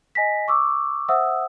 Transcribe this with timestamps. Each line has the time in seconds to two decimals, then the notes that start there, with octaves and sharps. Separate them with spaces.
0.15 D#5 G#5 A#6 B6
0.48 C#6 D6 E6
1.09 C5 E5 F#5 D#6 E6